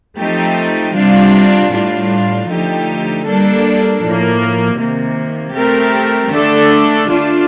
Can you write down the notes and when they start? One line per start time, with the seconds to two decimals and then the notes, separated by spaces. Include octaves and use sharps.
0.19 F3 A3 C4 D#4 G4
0.96 C3 G3 D4 F4
1.72 A2 G3 D4 F4
2.49 D3 F3 A3 D#4 G4
3.25 G3 A#3 D4 A4
4.01 A2 F3 A#3
4.78 C3 D#3 A#3
5.54 A3 C4 G4 A#4
6.30 D3 A3 D4 A4
7.07 A3 D4 F4